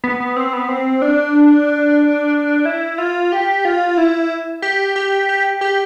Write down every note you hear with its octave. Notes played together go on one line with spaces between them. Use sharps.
B3
B3
C4
B3
C4
D4
E4
F4
G4
F4
E4
G4
G4
G4
G4